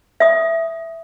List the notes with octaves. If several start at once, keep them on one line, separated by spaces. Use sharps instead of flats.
E5 D#6